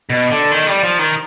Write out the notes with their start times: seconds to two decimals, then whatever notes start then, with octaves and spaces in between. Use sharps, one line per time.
0.10 B2
0.30 D3
0.51 D#3
0.67 G3
0.84 F3
0.99 D#3